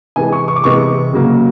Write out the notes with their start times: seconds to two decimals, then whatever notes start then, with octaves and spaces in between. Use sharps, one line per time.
0.16 C3 E3 G#3 G#5
0.33 C#6
0.48 C#6
0.56 D6
0.64 C3 E3 G#3 C#6
1.13 C#3 F#3 A#3